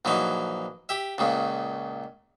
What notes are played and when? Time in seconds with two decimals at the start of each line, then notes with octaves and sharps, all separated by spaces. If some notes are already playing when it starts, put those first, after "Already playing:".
0.05 A#1 E3 F#3 D#4
0.89 G4 E5
1.18 C#2 A#2 C#3